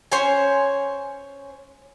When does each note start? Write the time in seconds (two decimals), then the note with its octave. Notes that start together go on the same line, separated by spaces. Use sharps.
0.12 C#4 C5 C#5 G#5